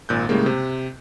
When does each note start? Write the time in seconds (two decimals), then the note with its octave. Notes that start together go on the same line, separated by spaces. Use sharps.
0.09 G#1 A#2 F#6 G6
0.29 A2 C#3 G3 G#3 A#3
0.46 C3